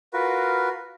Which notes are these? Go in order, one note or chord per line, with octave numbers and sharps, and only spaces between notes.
F4 F#4 A#4 B4